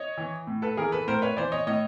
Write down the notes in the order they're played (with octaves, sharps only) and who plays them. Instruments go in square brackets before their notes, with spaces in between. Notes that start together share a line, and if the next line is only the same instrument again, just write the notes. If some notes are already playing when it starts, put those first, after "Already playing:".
Already playing: [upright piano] C#5 D#5
E3
A2
A4 B4
E3 G#4 A#4
A4 B4
A2 A#4 C5
B4 C#5
E3 C5 D5
C#5 D#5
A2 C#5 D#5